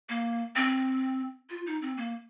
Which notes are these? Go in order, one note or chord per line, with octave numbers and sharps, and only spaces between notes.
A#3
C4
F4
D#4
C4
A#3